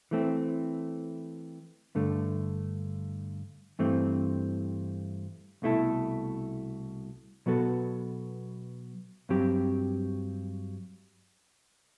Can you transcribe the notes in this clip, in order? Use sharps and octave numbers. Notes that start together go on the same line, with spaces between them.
E3 A3 C4
G2 D3 A3
G2 E3 A3 C4
C2 B2 A3 E4 A4
B2 F#3 B3 F#4 A4
G2 F#3 C4 G4